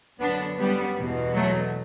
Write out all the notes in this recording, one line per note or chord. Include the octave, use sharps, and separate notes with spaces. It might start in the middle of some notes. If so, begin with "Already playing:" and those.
F#2 D3 B3 D4
G3 B3
E2 B2
F#3 A3